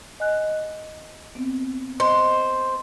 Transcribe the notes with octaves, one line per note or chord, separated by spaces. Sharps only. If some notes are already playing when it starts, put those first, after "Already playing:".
D#5 G#5 F#6
B3 C4
C5 D#5